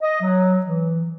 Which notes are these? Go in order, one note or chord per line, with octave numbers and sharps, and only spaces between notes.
D#5
F#3
E3